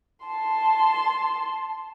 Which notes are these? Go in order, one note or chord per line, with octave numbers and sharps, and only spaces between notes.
A5 C6